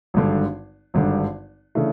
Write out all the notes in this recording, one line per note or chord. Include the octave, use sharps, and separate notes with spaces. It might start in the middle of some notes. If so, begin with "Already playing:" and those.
G#1 G2 D3
G#1 G2 D3
C#3 E3 A3 D4